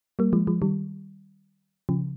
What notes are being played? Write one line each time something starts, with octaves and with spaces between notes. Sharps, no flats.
G3 A#3
F3 G#3
F3 G#3
D#3 G3
C#3 F3